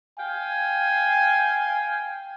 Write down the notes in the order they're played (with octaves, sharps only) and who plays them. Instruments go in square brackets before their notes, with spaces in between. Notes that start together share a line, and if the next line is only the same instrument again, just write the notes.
[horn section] F5 G5 G#5